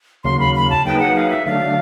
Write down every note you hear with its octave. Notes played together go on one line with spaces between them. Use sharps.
D#2 C#3 F#3 A#3 C6
B5
B5
A5
F#3 A#3 D#4 G#4 B4 G5
F#5
F5
E5
D3 F#3 A3 D4 F5